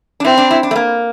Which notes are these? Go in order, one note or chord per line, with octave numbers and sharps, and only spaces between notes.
D4
C4 E4
D4
E4
D4
A3
A#3